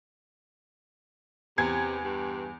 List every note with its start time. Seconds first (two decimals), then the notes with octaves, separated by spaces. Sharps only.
1.58 E2 C3 G#6
2.03 G2